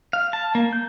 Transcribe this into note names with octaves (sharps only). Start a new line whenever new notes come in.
F5
A5
A#3
G6